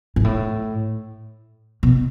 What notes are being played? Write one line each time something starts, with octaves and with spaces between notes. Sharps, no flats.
G#2
A2
B2